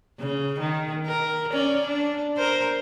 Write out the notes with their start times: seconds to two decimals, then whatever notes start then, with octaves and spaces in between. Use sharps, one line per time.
0.20 C#3
0.60 D#3
1.07 A#4
1.52 C#4 D5
1.87 D4
2.37 A#4 C5